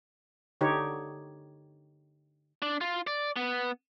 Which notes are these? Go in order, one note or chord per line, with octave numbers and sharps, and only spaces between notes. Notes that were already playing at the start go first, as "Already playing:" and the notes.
D3 D#4 G4 C#5
D4
F4
D5
B3